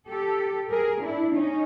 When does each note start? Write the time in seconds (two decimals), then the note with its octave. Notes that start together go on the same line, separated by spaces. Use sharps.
0.09 G4 A4
0.71 G#4 A#4
1.02 D4 E4
1.33 C#4 D#4